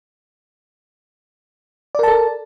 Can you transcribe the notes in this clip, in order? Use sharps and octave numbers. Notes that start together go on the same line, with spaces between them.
A4 A#4 D5 A5